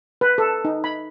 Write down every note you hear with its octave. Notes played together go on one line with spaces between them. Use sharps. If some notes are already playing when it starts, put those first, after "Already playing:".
B4
A4
D#4
B5